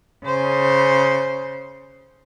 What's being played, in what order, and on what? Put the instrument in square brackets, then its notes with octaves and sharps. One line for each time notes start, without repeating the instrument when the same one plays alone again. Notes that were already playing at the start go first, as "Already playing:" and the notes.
[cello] C#3 C5